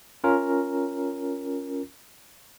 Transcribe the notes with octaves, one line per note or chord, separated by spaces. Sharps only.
C#4 F4 A#4